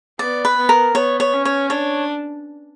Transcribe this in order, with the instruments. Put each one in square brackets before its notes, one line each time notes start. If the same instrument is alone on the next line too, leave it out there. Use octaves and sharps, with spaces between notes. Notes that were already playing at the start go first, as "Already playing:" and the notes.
[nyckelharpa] B3 [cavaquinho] D5
[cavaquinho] B4
[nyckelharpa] B3
[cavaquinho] A#4
[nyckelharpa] B3 [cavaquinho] C#5
[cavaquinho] C#5
[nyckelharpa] C#4
[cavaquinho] C#5
[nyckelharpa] D4 [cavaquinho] C#5